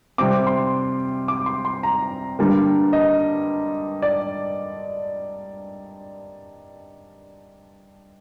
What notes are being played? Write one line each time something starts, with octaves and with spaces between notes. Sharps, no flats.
C3 G3 C4 D6
C6
D6
C6
C6
A#5
G2 D3 G3 A#3
D#5
D5